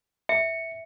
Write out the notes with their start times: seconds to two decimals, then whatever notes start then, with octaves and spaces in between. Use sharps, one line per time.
0.29 E5 C#7